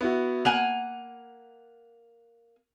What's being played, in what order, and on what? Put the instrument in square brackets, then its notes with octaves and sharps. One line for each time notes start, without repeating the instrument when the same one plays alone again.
[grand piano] B3 E4 F#4
[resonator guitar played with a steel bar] A#3 F#5 G#5 [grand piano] F7